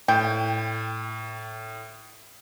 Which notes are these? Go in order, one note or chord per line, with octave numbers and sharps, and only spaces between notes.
A2 G5